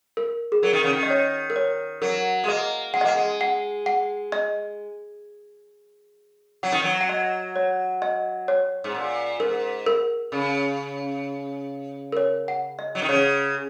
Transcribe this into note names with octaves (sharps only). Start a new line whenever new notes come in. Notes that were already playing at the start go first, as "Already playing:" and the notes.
A#4
G#4
F#3 A#4
D#3
C#3
D#3
D#5
C#5
A#4
C#5
F#3 A#4
G#3
A#3 D#5
G#3 F#5
D#5
A#3 F#5
G#3
F#5
F#5
D#5
F#3 F#5
D#3
F#3
F#5
D#5
C#5
D#5
C#5
G#2
A#2
G#2 A#4
A#4
C#3
A#4
C#5
F#5
D#5
F#3
D#3
C#3 C#5